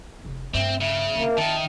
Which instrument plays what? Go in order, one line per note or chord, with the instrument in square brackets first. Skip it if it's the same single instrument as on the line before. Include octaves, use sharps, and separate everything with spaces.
[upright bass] F1
[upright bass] G2 A3 [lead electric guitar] C4 [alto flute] E5
[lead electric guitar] C#3 [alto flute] E5
[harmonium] A#3 [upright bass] C4 F4
[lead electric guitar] D#3 [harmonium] A5